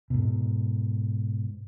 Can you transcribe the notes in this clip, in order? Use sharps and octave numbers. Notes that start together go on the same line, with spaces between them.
G#2 B2